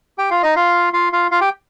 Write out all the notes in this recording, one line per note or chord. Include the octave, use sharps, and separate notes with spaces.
G4 G5
F4 F5
D#4 D#5
F4 F5
F4 F5
F4 F5
F4 F5
G4 G5